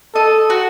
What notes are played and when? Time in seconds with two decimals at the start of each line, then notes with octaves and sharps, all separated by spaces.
0.15 A4 D#5
0.50 F#4